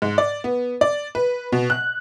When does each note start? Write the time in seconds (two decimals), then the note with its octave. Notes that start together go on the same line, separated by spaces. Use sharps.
0.02 G#2
0.18 D5
0.44 B3
0.81 D5
1.15 B4
1.52 B2
1.70 F#6